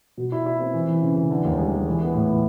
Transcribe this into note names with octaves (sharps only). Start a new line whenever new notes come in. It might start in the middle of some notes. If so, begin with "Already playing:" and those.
B2
E4
E4
C4
E3
E3
C#3
E3
D3
D#2
G#3
G#3
E3
B3
A2
E3